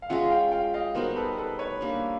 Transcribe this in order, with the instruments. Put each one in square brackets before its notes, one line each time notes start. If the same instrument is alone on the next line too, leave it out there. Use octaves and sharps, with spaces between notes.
[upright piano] F5
[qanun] G#3 C#4 F4 [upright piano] E5 F#5
[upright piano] F5 G5
F5 G5
D#5 F5
[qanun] G3 B3 D#4 F#4 [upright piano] A#4 C5
[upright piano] A4 B4
A4 B4
B4 C#5
[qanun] G3 A#3 D4